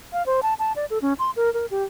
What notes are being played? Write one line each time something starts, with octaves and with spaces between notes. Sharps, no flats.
F5
C5
A5
A5
D5
A4
C#4
C6
A#4
A#4
G4